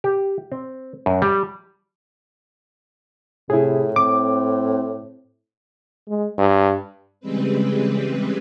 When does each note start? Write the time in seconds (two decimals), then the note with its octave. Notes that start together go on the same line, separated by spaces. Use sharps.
0.04 G4
0.52 C4
1.06 F#2
1.22 G3
3.50 A2 C3 E4 G#4
3.96 C4 D6
6.07 G#3
6.38 G2
7.20 C#3 E3 G3 G#3 C4 B4